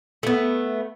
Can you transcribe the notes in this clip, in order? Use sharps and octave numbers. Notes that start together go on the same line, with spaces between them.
A3 B3